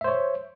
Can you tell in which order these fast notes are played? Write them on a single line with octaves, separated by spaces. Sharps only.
E5 C5 C#5